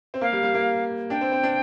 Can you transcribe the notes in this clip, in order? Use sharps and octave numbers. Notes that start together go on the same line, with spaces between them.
C4
A#3 F5
G3
G3
A#3
D4 G5
C4
C4
D4